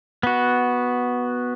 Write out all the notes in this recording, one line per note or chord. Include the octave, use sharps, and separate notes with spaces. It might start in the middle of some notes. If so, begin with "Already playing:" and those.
B3 F#4